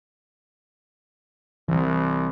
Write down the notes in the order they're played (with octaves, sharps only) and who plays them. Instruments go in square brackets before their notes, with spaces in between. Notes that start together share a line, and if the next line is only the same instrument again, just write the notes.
[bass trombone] C2 [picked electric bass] E3